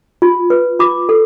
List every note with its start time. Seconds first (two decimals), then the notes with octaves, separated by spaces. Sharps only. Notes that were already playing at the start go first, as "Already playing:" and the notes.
0.22 F4
0.50 B4
0.79 F4 D6
1.09 A4